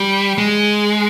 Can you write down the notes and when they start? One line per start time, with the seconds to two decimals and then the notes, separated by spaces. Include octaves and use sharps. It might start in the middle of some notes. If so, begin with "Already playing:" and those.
Already playing: G3
0.38 G#3